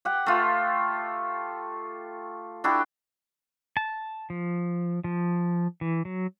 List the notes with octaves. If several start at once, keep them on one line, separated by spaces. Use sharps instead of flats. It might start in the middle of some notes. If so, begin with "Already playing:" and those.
G4 F#5
A3 F4
D4 E4 F#4 G4
A5
F3
F3
E3
F#3